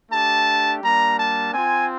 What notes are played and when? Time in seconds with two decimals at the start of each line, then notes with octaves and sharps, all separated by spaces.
0.10 A3 D4 G4 A5
0.82 G3 A#3 D4 A#5
1.18 A5
1.53 C4 F4 G#5